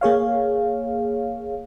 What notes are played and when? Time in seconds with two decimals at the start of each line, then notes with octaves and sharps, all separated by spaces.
0.01 A#3 G#4 C#5 F5